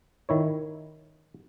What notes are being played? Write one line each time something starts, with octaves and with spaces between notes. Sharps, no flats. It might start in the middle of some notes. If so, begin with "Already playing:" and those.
D#3 E4 C#5